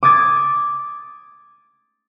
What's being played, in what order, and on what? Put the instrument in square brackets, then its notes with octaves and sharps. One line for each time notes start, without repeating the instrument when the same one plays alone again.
[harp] D6 D#6 G#6 A6 D7